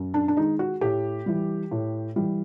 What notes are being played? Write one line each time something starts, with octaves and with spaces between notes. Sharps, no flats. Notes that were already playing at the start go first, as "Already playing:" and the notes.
Already playing: F#2
D4
D4
D#3 G#3 D#4
F#4
A2 G4
E3 G3
A2
E3 G3